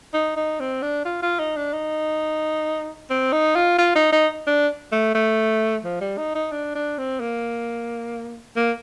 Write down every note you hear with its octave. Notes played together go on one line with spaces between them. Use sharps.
D#4
D#4
C4
D4
F4
F4
D#4
D4
D#4
C4
D#4
F4
F4
D#4
D#4
D4
A3
A3
F3
G3
D#4
D#4
D4
D4
C4
A#3
A#3